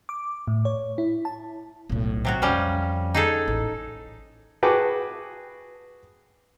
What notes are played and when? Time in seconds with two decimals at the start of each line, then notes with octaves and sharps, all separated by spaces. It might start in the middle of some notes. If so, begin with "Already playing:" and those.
0.09 D6
0.47 A2
0.65 C#5
0.98 E4
1.25 A5
1.89 B1 A2
2.25 C3 F#3 F#4
2.42 F2 F3 G3 C#4
3.14 D#4 G#4 A4
3.48 A1
4.63 F#4 G#4 B4 G5 A5 D6